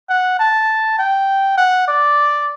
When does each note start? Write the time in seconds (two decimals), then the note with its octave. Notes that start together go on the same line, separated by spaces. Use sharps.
0.10 F#5
0.39 A5
0.99 G5
1.57 F#5
1.88 D5